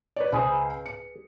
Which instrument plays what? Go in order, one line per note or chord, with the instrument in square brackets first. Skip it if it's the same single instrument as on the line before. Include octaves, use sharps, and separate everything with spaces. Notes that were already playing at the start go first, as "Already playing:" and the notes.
[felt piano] B4 D5 [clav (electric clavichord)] C#5
[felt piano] C#2 C5 [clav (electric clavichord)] G#4 B4
[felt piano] C#7